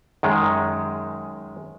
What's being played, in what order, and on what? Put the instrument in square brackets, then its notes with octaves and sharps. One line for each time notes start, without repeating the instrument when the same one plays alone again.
[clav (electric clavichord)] F#2 D#3 G#3